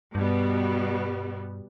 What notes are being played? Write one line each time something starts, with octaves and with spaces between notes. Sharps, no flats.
G2 B2 G3 B3